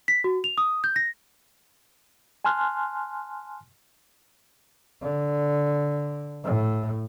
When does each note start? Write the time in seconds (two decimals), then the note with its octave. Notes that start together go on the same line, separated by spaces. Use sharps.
0.08 B6
0.24 F#4
0.44 F7
0.58 D#6
0.84 G6
0.96 A#6
2.45 G#5 A5 C6 F6 F#6
5.02 D3
6.44 A2